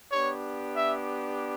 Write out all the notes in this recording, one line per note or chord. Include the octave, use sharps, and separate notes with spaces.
B3 D4 G4 C#5
E5